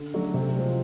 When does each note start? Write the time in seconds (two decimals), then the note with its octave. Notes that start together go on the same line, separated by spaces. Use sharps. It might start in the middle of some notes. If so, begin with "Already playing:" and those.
Already playing: D3
0.14 F#3 A3 D4 F#4
0.34 C3
0.55 F3 G#3